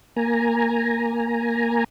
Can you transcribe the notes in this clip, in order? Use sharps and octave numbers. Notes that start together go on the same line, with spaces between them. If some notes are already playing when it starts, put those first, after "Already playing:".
A#3 G#5 A#5